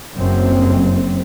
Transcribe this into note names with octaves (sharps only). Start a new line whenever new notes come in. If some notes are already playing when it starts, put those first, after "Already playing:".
F#1 F#2 C4